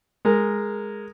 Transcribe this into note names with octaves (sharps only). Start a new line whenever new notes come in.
G#3 A#4